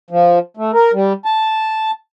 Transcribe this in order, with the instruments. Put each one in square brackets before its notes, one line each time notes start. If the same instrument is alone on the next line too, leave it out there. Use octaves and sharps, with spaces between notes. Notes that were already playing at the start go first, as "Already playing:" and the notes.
[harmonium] F3
A3
A#4
G3
A5